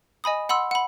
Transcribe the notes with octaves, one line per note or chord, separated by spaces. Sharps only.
D#5 G#5 B5 D#6
F#5 B5 C6 E6
F#5 B5